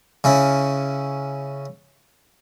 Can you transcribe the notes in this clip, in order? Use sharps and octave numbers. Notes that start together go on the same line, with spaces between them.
C#3 C#4 E4